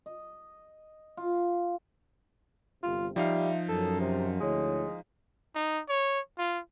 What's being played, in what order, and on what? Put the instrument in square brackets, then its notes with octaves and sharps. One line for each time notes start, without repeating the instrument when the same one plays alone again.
[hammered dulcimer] D#5
F4
[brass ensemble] G1 C3 [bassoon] F4
[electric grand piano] F3 D#4 F5 [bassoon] G3 [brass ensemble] E5
[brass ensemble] F#2 [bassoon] A4
[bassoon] C3
[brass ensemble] D2 E4 C#5 [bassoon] G#3
[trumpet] D#4
C#5
F4